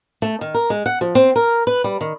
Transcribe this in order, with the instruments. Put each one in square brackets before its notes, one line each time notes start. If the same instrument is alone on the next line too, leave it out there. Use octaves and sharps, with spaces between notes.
[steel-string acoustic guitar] A3
D#3
A#4
G#3
F#5
F3
C4
A#4
B4
G3
D#3